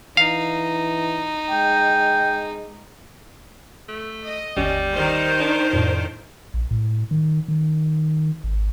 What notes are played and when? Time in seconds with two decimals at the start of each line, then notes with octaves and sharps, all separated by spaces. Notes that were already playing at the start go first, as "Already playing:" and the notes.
0.17 E3 D#4 F5
1.50 G#3 G5
3.89 A3
4.25 D#5
4.57 G1 D#2 G3 C#4
4.94 D#3 C5
5.40 D4
5.73 F2 A2 D4
6.54 A#1
6.71 A2
7.11 D#3
7.48 D#3
8.44 G#1